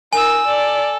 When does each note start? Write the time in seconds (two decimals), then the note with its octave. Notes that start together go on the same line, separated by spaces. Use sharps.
0.13 D#4 A#4 G#5 E6
0.46 A4 D5